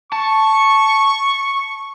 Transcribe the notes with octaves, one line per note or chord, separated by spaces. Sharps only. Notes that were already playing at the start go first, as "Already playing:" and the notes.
A5 C#6